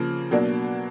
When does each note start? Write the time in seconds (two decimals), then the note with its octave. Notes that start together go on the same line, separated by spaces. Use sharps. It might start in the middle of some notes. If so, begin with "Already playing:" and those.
Already playing: C#3 F3 A#3
0.31 B2 F#3 A#3 D4